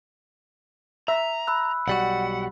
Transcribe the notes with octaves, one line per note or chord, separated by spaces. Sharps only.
E5 A#5
B5 E6 F#6
B1 G3 F#4 F#5